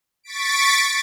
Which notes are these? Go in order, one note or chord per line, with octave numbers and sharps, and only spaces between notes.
C#6 A6 B6 D7